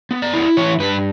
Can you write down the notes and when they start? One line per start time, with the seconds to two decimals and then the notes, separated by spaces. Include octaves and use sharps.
0.11 B3
0.22 D5
0.34 E4
0.57 E3 C#5
0.80 G2 B4